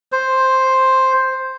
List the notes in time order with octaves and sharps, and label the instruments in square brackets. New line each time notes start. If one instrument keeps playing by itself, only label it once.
[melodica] C5